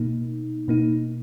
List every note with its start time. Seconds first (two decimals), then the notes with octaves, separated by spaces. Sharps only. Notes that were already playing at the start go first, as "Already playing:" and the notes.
Already playing: B2 A#3 D#4
0.68 B2 A#3 D#4